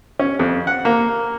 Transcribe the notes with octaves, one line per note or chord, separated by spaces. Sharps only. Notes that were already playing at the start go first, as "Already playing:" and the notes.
C#4
F2
F#5
A#3